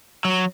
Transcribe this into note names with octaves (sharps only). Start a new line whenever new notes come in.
F#3